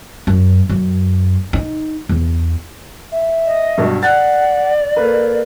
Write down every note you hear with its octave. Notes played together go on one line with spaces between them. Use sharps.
F#2
F#2
D#4
E2
E5
D#5
G2 B2 F#3
D5 F#5 F#6 A6
A#3 A4 B4